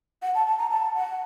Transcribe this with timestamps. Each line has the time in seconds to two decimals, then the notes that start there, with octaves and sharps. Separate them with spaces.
0.23 F#5
0.35 A5
0.47 A5
0.58 A#5
0.71 A5
0.95 F#5